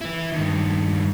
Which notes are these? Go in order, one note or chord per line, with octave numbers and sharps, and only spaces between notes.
E3 E4
G2 D#3